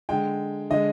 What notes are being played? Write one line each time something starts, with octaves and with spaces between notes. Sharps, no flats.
D3 G#3 G5
D3 G#3 D#5